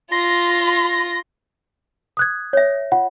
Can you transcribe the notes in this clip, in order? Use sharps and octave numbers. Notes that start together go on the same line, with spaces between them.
F4 C6 A#6
D#6 F#6 G#6
C#5 E5
F4 F#5